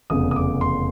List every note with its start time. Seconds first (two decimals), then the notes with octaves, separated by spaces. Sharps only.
0.10 F1 E2 C#3 D#6
0.31 D#6
0.36 D6
0.61 C6